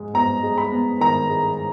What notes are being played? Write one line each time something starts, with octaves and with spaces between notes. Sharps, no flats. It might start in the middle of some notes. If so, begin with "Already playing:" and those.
Already playing: G#2 G#3
B3 A#5
G#3
B5
B3
D#3 A#5
G#3